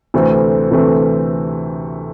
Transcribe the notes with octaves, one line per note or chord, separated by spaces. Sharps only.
D2 C3 E3 A3 C4
D2 C3 E3 A3 C4